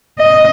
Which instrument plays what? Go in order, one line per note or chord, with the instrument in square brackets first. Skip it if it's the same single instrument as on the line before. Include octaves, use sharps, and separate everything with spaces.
[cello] D#5